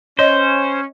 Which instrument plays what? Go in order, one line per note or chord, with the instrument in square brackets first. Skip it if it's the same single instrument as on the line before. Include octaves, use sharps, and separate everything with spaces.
[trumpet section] C#4 [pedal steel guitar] C5 [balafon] C#5 D#5